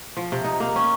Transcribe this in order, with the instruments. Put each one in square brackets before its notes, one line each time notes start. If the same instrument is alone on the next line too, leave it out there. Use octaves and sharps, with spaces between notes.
[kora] F3
C3
D#4
A#3
C#4